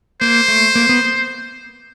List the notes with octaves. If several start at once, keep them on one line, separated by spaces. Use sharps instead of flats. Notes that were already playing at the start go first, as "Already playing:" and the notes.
A#3 C5
A3
A#3
B3